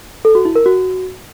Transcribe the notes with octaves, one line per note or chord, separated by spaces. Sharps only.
A4
F#4
E4
A#4
F#4